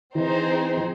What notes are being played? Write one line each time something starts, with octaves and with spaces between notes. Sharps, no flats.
E3 C4 D#4 G#4 C5
F3